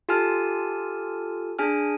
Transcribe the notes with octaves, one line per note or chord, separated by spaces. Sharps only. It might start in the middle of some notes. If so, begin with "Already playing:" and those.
F4 G4 A4 G#5 A5 F6
D4 G#4 G#5 F6